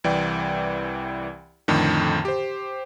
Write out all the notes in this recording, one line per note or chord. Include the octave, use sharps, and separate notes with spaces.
C2 E3 D5 G5
F2 A2 D3 D#3
G4 C5